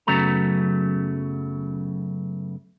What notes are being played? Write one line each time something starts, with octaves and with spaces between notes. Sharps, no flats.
F#2 C#3 F#3 A3 B3 A#5